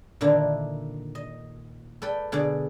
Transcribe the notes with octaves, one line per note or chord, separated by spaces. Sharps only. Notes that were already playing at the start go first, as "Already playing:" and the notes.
A#2 D3 D#3 D4 E4
D#5
A4 B4 D5 G5
B2 D3 G#4 D5